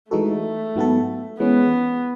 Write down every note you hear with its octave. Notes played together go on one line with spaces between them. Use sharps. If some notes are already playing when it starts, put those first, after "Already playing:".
E3 G#3 A3 D#4 F#4 A4
G#2 F#3 B3 F#4 A4
E3 G#3 B3 C#4